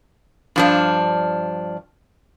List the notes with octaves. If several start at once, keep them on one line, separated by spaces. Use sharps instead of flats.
G2 F3 D4